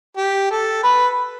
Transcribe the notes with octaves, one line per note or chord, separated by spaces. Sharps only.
G4
A4
B4